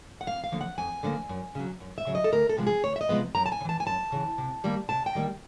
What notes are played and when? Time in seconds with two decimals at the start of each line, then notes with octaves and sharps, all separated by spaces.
0.21 F#5
0.27 F2 F5
0.44 F5
0.52 D3 F3 A#3
0.61 F#5
0.78 F2 G#5
1.03 D3 F3 A#3
1.29 F#2
1.55 C#3 F#3
1.80 F#2
1.98 E5
2.07 C#3 F#3
2.15 D#5
2.24 A4
2.32 D2 A#4
2.49 A4
2.57 C3 F3 G#3 B3
2.67 G#4
2.83 D2 C#5
2.96 E5
3.01 D#5
3.09 C3 F3 G#3 B3
3.35 F#2 A#5
3.46 A5
3.52 G#5
3.61 C#3
3.65 E3 A5
3.80 G#5
3.86 F#2 A5
4.12 C#3 E3
4.38 C3
4.64 D#3 G3 A#3
4.89 C3 A5
5.06 G5
5.15 D#3 G3 A#3